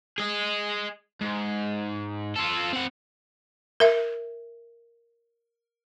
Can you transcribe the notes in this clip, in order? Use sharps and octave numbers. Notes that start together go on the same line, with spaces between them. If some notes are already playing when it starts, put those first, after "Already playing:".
G#4 D#5
G#2
F4 A4
C4 F#5
A#4 E5